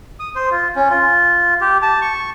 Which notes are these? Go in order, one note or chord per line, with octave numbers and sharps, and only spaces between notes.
D#6
C5
F4
C#4
F4
G4
A5
C#6